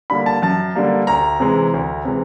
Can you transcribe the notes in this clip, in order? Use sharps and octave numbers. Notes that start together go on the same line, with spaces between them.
D3 G3 A#3 B5
A5
F#2 A5
D3 G3 A#3
D2 A#5
C3 E3 G#3
D2
C3 E3 G#3